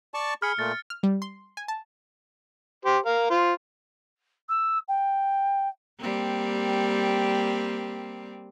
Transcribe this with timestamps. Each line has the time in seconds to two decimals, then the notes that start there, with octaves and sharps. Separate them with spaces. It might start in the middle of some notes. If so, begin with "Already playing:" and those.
0.14 D5 A5 C#6
0.42 G#4 B5 F6 C#7
0.59 A#2 A3 A6
0.90 F6
1.03 G3
1.22 C6
1.57 G#5
1.68 A5
2.85 G4 C5
3.06 A#4 F5
3.30 F4 C5
4.49 E6
4.88 G5
6.00 G3 A#3 C4